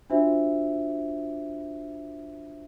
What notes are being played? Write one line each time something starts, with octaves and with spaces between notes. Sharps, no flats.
D4 F4 F#4 C5 E5